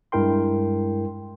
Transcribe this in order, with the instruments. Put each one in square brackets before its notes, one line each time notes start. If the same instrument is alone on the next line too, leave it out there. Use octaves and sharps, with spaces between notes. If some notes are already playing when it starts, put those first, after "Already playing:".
[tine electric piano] G2 G#3 E4 A#4 G5 C6